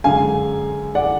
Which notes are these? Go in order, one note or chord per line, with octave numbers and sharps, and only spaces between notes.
F#2 D3 G#3 F5 G#5
D5 F#5